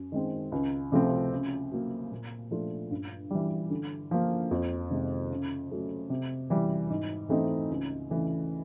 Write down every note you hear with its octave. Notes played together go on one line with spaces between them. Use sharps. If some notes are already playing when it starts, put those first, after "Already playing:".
Already playing: F#2
D#3 G#3 C4
C#2
C3 F3 A3 C4
C#3
F#3 A#3
A#2
F3 A3 D4 F4
G2
E3 G3
D3
F3 A#3
F2
C3 D#3 G#3
C#3
F#3 A3 C#4
C3
E3 G3
G#2
E3 A3 C4 D#4
C#2
C#3 E3 A3 D4